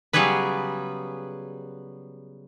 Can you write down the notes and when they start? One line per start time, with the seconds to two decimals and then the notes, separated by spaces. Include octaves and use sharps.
0.13 C#3 F#3 G3 B3 G#4 B4